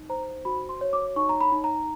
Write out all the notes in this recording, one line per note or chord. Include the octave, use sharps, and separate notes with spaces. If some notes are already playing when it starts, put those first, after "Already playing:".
Already playing: D#4
C5 A#5
F#4 B5
C6
C#5
D6
D#4 C#6
A#5
B5
D#4
A#5